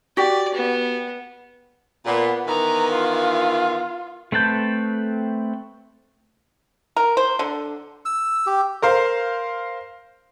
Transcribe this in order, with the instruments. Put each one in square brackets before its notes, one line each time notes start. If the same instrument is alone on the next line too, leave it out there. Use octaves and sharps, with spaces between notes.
[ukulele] F#4 G4 [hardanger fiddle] D5
[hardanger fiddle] B3
[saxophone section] A#2 [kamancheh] B3
[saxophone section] D#3 E3 B3 [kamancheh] A#5
[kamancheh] F4
[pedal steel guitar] A3 C4 B4 A5 G6
[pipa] A#4
C5
D3
[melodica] E6
G4
[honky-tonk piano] A#4 C5 F5